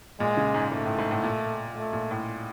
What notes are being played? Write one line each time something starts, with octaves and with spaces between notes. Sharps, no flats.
A#2 G#3
C#3
G#2
G#2 A3
A2
G#2
A2
A#2
A3
A#2
A2